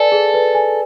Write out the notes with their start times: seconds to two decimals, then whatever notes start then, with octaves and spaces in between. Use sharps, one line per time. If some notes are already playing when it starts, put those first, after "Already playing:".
Already playing: A4 B4 D5 G#5
0.12 G#4
0.34 B4
0.55 G#5